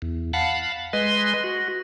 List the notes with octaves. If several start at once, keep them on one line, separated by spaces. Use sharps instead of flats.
E2
F5 F#5 A5 B5
G#3 B4 D#5 C6
F#4